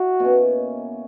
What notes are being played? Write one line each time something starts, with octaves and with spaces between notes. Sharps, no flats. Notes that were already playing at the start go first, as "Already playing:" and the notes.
Already playing: E4 F#4
B2 A#3 C#4